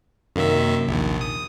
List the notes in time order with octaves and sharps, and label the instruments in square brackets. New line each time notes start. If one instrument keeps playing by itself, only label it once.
[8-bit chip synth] F#2 D#3 E5 [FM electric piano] C3 A#3
[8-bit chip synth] A#1 D#2
D#6